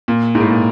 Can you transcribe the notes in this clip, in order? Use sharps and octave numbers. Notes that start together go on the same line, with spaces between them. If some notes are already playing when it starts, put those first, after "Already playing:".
A#2
G#2
A2
A#2